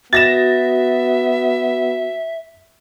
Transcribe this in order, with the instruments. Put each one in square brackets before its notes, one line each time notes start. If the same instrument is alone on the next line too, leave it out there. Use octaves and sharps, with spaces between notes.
[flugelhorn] B3 [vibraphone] F#4 [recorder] E5 [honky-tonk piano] A6 A#6 E7